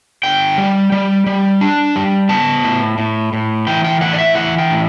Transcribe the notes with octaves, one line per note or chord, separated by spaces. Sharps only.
D3 G5
G3
G3
G3
D4
G3
B3 A5
A2
A2
A2
E3 G5
G5
A2 F#5
D5
E5
E3 F#5
G5
A2